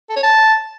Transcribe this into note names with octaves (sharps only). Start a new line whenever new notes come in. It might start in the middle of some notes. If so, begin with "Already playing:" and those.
A4
C#5
A5